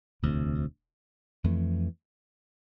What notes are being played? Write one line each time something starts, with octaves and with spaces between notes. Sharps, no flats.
E1 D2 C3
F2 E3 A3